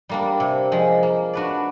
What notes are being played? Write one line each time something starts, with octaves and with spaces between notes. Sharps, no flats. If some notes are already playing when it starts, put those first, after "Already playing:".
G3 A#3 D4
C3
F3 G#3
A#3
D4 F#4 B4 D5